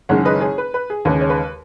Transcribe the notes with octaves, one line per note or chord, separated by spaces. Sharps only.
F#1 F#2 D#3 G#3 C#4 C#5 F#5
B4 D#5
G#4 C#5
B4
B4
G#4
D#2 C#3 G#3 C#4 B4
C#5
B4